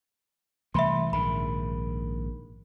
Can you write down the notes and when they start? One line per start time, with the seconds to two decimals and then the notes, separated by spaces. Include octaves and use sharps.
0.74 C2 E3 A3 E5 B5 C6
1.13 A#1 G#2 D#3 B5